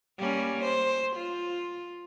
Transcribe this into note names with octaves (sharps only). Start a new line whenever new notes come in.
G3 A#3 C#4
C5
F4